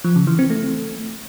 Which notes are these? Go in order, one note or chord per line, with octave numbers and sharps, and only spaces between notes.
F3
C#3
E3
C4
A3